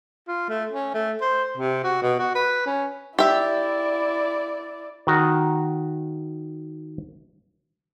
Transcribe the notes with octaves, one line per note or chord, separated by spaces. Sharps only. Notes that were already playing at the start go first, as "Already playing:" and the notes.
F4
A3
C#4
A3
C5
C3
F#4
B2
F#4
B4
C#4
E4 G4 D5 E5
D#3 F#4